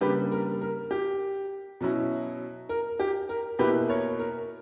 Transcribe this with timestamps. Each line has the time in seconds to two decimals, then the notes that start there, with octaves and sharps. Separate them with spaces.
0.01 C#3 G3 A#3 D4 G4 B4
0.32 A#4
0.61 A#4
0.91 G4
1.81 B2 F#3 C#4 E4
2.69 A#4
3.00 G4
3.29 A#4
3.59 B2 A#3 E4 G4 B4
3.89 A#4 C#5
4.19 A#4